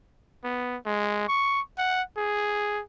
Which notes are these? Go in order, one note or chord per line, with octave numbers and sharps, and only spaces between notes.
B3
G#3
C#6
F#5
G#4